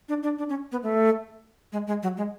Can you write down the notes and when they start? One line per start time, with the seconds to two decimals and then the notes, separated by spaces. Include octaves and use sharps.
0.09 D4
0.23 D4
0.39 D4
0.49 C#4
0.72 B3
0.83 A3
1.73 G#3
1.87 G#3
2.03 F#3
2.17 G#3